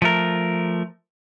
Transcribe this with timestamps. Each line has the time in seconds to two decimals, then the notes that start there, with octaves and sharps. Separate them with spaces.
0.02 F3 A3 A#4